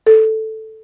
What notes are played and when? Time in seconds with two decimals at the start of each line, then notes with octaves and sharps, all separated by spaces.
0.07 A4